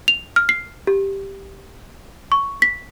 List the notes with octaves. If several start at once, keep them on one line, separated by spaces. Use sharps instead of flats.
F7
F6
C7
G4
C#6
B6